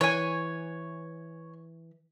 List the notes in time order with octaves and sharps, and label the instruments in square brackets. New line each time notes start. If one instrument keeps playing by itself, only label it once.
[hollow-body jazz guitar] E3 [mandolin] C#5 G#5